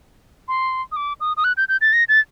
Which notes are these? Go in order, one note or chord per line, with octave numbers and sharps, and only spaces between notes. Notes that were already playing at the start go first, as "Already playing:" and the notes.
C6
D#6
D6
D#6
D#6
F#6
G6
G6
A6
A#6
A6